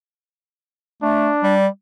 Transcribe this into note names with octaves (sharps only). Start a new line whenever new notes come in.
A3 D4
G3